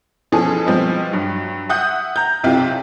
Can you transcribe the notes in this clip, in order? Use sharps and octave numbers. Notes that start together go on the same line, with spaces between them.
B2 E3 F3 C#4 G#4 A4
B2 F3 G3 G#3 C4
G2 F#3
E5 F#5 D#6 F#6 G6
A#5 G6
B1 C3 E4 F4 G4 G5